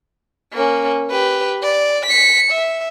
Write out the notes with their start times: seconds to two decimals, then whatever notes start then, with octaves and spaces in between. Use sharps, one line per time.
0.53 A#3 C#4
1.10 G4 B4
1.63 D5
2.06 B6 C#7
2.51 E5